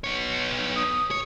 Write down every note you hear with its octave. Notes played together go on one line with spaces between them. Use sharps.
B3 C#5
D#6
C#5